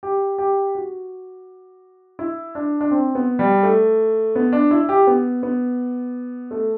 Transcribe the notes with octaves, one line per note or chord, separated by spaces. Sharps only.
G4
G4
F#4
E4
D4
D4
C4
B3
G3
A3
B3
D4
E4
G4
B3
B3
A3